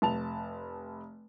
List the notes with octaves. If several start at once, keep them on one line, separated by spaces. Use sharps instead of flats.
F1 A5 F7